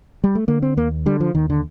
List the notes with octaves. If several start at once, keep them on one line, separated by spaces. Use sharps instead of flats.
G3
A3
D3 A#3
C4
D#2 A#3
D3 G3
F3
D#2 D#3
D3